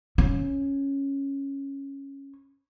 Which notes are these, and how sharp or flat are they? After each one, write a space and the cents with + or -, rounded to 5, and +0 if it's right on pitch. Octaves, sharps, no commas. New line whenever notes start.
C#4 -5